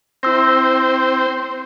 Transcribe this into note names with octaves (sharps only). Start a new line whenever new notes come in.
C4 E4 C5 E6 A#6